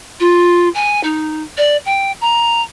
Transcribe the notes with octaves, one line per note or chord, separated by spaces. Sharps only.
F4
G#5
D#4
D5
G5
A#5